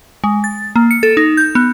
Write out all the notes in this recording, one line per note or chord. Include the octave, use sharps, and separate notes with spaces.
G#3
A6
A#3
C#7
A4
D#4
G6
B3